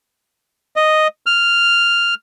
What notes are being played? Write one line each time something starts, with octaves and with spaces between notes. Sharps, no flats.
D#5
F6